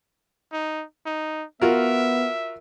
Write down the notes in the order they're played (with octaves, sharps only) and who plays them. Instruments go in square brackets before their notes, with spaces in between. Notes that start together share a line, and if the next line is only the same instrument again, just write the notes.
[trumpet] D#4
D#4
[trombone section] B3 [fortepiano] F4 F#4 A#4 [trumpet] E5